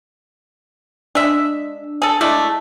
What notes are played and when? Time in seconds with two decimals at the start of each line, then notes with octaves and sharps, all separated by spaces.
1.15 G#3 D4 E5
2.02 G#4 A4
2.21 G#3 A3 D4 E4